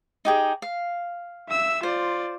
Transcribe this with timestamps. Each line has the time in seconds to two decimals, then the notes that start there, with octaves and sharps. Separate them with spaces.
0.25 D#4 G4 G#4
0.62 F5
1.49 E5 E6
1.83 F4 C5 D5